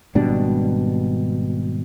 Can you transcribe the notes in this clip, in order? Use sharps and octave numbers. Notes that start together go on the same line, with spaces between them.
G#1 B2 G3 D4